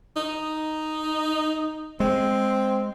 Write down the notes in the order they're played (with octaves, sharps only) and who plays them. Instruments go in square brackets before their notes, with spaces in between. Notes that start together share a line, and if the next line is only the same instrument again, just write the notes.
[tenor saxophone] D#4
[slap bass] G#3 [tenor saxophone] C4